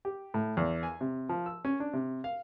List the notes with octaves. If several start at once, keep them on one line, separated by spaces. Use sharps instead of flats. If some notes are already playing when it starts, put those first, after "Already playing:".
G4
A2
E2
G#5
C3
F3
E6
C#4
D4
C3
F5